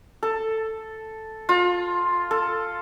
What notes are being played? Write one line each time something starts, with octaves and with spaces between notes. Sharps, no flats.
A4
F4
A4